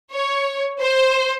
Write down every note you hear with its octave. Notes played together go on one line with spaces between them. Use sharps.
C#5
C5